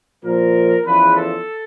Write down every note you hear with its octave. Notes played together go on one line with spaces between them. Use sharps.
A#2 F3 A#4
E2 C#3 F3 B4
A4